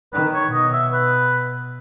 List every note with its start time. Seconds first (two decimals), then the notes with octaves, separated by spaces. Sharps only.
0.13 D#3 B4
0.33 C#5
0.52 B2 D#5
0.73 E5
0.93 B4